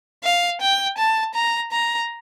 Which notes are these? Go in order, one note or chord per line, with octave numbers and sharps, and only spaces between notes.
F5
G5
A5
A#5
A#5